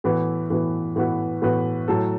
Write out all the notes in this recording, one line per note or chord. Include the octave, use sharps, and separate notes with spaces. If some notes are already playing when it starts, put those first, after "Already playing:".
A2 E3 B3 F#4 B4
A2 E3 B3 F#4 B4
A2 E3 B3 F#4 B4
A2 E3 B3 F#4 B4
A2 F#3 A3 F#4 A4